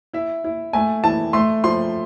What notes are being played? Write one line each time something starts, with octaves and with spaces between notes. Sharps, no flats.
E4 E5
E4
A3 G#5
E3 A5
A3 C6
F3 C6